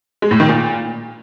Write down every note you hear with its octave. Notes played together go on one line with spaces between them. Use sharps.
G#3
A2
D#3
A#2